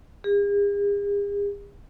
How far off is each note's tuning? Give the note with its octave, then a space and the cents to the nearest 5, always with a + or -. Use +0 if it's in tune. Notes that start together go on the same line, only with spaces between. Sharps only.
G#4 -45